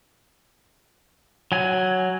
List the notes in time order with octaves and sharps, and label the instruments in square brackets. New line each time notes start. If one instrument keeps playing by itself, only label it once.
[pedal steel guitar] F#3 G#5